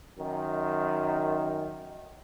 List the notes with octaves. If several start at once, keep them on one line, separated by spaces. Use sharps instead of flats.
F#2 D#3